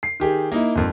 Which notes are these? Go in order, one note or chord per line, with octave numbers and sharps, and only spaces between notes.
C7
D#3 G4 G#4
A#3 D#4 E4
G#1 F2